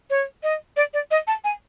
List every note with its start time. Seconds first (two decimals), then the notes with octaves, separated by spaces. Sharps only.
0.10 C#5
0.43 D#5
0.77 D5
0.94 D5
1.11 D#5
1.27 A5
1.44 G#5